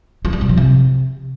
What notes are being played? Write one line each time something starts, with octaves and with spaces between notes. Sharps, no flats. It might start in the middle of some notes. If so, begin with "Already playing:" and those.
F3
G3
B2
F3
C3